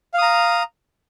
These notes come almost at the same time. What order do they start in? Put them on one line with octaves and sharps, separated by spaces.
F5 D#6 A#5